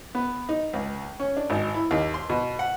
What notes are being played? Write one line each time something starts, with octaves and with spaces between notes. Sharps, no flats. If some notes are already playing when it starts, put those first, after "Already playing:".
B3
D#4
C#2
C#4
D4
G#1
E4
D#2
C6
B2
F#5